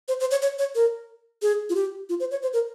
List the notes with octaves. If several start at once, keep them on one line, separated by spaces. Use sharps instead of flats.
C5
C5
C#5
C#5
C#5
A#4
G#4
F4
G4
F4
C5
C#5
C5
A#4